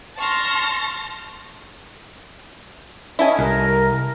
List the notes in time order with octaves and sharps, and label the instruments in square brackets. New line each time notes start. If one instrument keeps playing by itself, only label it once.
[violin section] A5 C6 C#6 F6 A#6
[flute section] C#4 D#5 [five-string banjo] E4 A4 G#5
[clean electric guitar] C2 [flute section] A#4